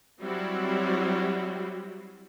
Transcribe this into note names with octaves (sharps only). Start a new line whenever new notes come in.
F#3 G3 C4 E4 F#4